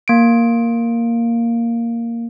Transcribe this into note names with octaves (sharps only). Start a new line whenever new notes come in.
A#3 D7